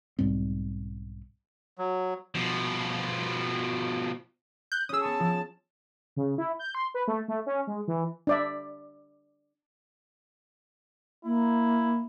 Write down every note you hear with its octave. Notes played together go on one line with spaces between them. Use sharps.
B1 G#2 G3 C4
F#3
B2 F3
F#6 G6
C#4 G#4 D#6 E6
B3 A5 C#6
F3
C#3
E4
G6
C6
B4
A3
A3
C#4
G#3
E3
D4 D5 E5
A#3 E4